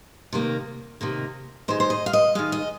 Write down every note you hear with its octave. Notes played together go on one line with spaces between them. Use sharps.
C3 D#3 A#3
C3 D#3 A#3
D#3 G#3 C5
C5
D#5
F5
D#5
D#3 G#3 F5
D#5